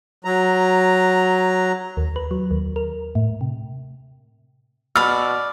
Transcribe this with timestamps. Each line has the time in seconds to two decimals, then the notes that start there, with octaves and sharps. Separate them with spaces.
0.25 F#3 A#5
1.97 D#2
2.16 B4
2.31 F#3
2.51 D#2
2.76 A#4
3.15 A2
3.41 C3
4.96 B2 D5 B5 E6 F6